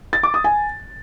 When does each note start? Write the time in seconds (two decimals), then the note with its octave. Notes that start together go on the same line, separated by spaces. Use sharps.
0.13 A6
0.23 D6
0.34 D#6
0.44 G#5